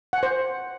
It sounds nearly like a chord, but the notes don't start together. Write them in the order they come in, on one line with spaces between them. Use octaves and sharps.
F#5 G#5 C5